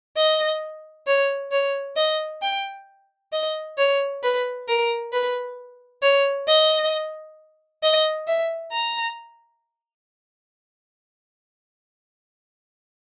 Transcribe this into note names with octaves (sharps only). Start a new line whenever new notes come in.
D#5
C#5
C#5
D#5
G5
D#5
C#5
B4
A#4
B4
C#5
D#5
D#5
E5
A#5